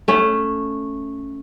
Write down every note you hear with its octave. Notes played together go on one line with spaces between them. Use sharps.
A3 C#4